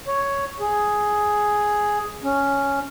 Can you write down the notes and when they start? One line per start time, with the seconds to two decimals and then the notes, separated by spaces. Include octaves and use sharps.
0.07 C#5
0.60 G#4
2.23 C#4